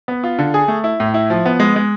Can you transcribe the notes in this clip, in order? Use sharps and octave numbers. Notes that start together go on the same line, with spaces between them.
B3
F4
D3
G#4
A3
E4
A2
E4
F3
B3
G#3
G#3